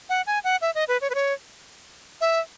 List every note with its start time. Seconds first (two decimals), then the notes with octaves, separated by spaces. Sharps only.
0.09 F#5
0.27 G#5
0.44 F#5
0.62 E5
0.75 D#5
0.88 B4
1.01 C#5
1.10 B4
1.15 C#5
2.21 E5